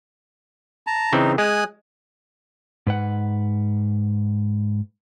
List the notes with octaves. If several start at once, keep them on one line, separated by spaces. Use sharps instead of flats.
A5 A#5
C#3 E3 C4 D#4
G#3 G#5 D#6 F#6
G#2 B4 F#5